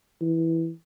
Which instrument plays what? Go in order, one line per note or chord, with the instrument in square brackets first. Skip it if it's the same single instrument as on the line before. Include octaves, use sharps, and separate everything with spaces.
[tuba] E3